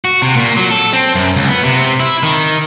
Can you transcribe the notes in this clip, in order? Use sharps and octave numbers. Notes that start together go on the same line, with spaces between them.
F#4
C3
A#2
F#3
A4
C4
F#2
C#2
B3
C3
E4
D#3